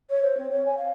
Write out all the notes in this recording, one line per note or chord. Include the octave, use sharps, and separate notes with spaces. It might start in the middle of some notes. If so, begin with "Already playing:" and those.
C#5
C5
C4
C#5
G#5
F5